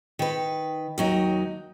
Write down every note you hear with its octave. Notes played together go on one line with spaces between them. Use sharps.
D#3 B4
D#2 F#3 D#4